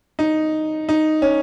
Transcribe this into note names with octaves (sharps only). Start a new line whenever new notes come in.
D#4
D#4
C#4